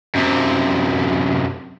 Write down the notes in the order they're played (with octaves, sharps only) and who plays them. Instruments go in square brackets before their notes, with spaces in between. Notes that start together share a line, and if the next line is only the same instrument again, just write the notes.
[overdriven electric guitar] F#2 C3